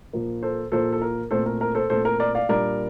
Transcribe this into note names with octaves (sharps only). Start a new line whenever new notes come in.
A#2 F3 A#3 F4
A4 C5
A#2 F3 A#3 F4 A4 C5
A4
A#4
A#2 A3 C4 A4 C5
A#4
A#4
A4 C5
A#2 A3 C4 A4 C5
A#4
A#4 D5
D5 F5
A#2 G3 A#3 D4 A#4 D5